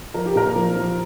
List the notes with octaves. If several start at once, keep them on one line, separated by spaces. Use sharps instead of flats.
F3 A#4
G4
A#2 A#4
F3
F3